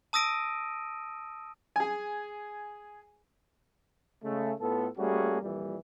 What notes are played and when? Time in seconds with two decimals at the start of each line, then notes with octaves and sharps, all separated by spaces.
0.13 A5 D#6 E6 A#6 D7 D#7
1.76 G#4 G#5
4.24 C#3 G#3 A3
4.60 A2 B3 F4 A4
4.98 G3 A3 A#3 C#4 F#4 G#4
5.42 F2 A#2 E3 G3